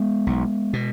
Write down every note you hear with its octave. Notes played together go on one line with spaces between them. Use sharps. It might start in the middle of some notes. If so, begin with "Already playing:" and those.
Already playing: G#3 B3
B1
B2